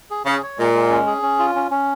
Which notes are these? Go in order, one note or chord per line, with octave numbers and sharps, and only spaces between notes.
G#4
C#3 G#4
C#5
A#2 G#3
G#3
C#4
G#4
C#4
F4
C#4
C#4